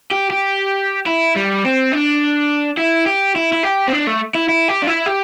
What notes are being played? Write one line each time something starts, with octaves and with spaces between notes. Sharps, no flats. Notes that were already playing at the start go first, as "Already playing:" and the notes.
G4
G4
E4
G3
C4
D4
E4
G4
E4
E4
G4
C4
D4
A3
E4
E4
G4
D4
E4
G4